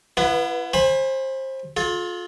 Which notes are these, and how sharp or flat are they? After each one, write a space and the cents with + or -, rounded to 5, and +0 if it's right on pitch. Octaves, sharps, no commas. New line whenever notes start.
B3 -20 E4 +40 B4 +0
C5 +25 G#5 -15 B5 +0
F4 +25 A4 -40